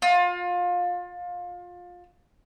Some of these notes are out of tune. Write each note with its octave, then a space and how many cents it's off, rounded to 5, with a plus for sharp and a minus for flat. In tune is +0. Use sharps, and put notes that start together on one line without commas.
F4 +25